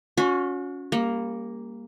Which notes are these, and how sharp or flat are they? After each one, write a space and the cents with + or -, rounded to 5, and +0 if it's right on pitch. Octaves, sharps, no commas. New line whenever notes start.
C#4 +20 F#4 -35
G3 +30 A#3 +0